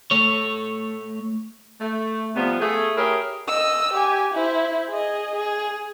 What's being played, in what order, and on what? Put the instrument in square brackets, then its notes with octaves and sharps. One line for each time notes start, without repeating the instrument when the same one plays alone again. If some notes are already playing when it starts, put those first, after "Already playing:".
[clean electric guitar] A3 C#5
[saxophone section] A3
C3 F3 G3 B3
A3 G#4
E4 G4 G#4 A#4 C#5
[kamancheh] D#5 E6
G4 G#5
E4 C5
G#4 D#5
G#4